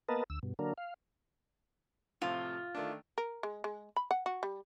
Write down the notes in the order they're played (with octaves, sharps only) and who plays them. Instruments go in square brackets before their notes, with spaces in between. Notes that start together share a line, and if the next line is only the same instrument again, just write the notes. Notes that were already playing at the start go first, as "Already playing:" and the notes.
[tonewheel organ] A#3 B3 A#4 B4 D#5 A5
D2 E6
G2 B2
D3 F#3 A#3 D4 A#4
F5
[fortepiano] A2 C3 F3 [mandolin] F4
[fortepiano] D#3 A3 D4
[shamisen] A#4
G#3
G#3
B5
F#5
F#4
G3